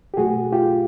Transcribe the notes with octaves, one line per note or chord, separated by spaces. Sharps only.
G4
B2 F#3 A3 F#4 G#4
F4 G4